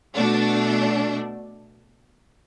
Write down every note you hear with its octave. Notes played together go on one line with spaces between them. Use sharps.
B2 A3 D4